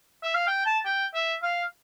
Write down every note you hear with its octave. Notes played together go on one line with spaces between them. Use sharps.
E5
F5
G5
A5
G5
E5
F5